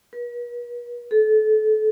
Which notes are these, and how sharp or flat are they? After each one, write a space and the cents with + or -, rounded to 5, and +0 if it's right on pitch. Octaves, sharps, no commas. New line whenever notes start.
B4 -45
A4 -30